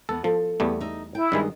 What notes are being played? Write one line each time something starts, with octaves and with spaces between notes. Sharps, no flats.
E2 B3 A4
F3 A4
E2 G3 A3 B3
D#4 E5
E4 G5
G2 D#3 G#3 D#5